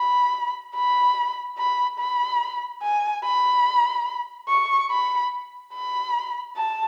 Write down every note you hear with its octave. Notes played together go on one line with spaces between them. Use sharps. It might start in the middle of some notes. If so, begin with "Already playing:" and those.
Already playing: B5
B5
B5
B5
G#5
B5
C#6
B5
B5
A5